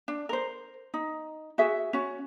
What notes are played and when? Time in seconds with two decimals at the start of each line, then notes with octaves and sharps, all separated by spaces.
0.08 D4
0.29 A#4 C5
0.94 D#4
1.58 F#4 G#4 E5
1.93 C#4 F#4